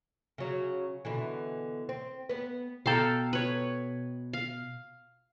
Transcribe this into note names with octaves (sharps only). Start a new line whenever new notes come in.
C#3 F#3
B2 D3 E3
C4
B3 B4
B2 A4 F5 G5 A#5
B4 C#5
F5